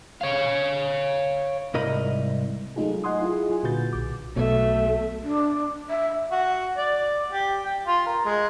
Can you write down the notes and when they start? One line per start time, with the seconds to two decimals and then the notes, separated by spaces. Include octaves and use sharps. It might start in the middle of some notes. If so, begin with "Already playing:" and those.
0.21 C#5 F5
1.74 C2 G#2 A#4 D#5 B5
2.76 F#3 G#3 A3 D#4 F4 G#4
3.04 D#5 F#5 G#5 C6 D#6
3.21 E4 F4 G#4
3.50 F#3 F4 G#5
3.63 A#2 D3 F#4 B4 G6 A6
3.93 B1 D6
4.36 B1 B2 A3 E5
5.23 D4
5.89 E5
6.32 F#4
6.77 D5
7.32 G4
7.64 G5
7.87 F4
8.07 A#4
8.26 G#3